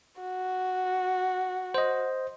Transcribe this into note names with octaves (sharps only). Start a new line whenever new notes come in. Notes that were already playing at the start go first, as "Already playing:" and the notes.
F#4
C5 D#5